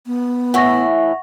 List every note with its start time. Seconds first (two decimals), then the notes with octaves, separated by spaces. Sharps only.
0.06 B3
0.54 A2 E3 F#5 C#6 A#6